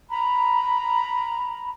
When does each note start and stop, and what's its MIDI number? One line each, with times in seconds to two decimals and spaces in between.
0.10 1.70 82
0.10 1.70 83